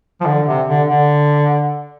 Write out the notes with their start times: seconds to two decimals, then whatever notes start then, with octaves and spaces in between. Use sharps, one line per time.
0.21 F3
0.26 D3
0.47 C3
0.68 D3
0.88 D3